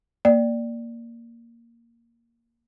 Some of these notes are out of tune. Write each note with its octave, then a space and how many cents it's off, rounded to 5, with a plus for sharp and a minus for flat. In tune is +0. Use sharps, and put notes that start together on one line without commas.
A#3 +0 D5 +0